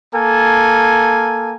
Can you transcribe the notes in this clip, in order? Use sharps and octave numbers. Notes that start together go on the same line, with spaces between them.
A#3 A4 G#5